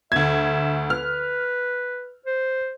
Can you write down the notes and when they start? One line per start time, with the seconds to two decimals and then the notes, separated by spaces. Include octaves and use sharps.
0.12 D2 E5 G#6
0.90 B4 F6
2.26 C5